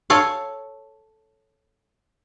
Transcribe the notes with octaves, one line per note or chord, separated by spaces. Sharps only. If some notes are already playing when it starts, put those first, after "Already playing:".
A4 C#5 F5